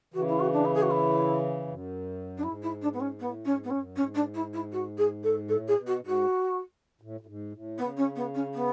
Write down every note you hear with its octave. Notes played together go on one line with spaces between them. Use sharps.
C#3 E3 F#4
E4
F#4
D4
E4
G#4
F#4
E4
F#2
D4
G#2 E4
E4
D4
B3
C#4
A2 B3
G#2 C#4
B3
F#2 C#4
G#2 C#4
D4
E4
E4
F#4
G#4
A4
A2 A4
G#4
B2
F#4
G#2
F#4
A2
A2
G#2
A2
C#3 B3
C#4
B3
C#4
B3